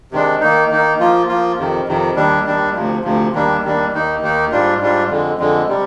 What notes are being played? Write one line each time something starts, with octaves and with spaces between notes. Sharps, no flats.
C3 D#3 G#3 D4
D#3 A#3 D#4
D#3 A#3 D#4
F3 A#3 F4
F3 A#3 F4
F2 C3 D#3
F2 C3 D#3
D#2 D#3 G3 D4
D#2 D#3 G3 D4
D2 C3 F3
D2 C3 F3
D#2 D#3 G3 A#3 D4
D#2 D#3 G3 A#3 D4
D#2 D#3 A#3 D#4
D#2 D#3 A#3 D#4
G#2 G3 D4 F4
G#2 G3 D4 F4
F2 D3 G#3
F2 D3 G#3
C3 G3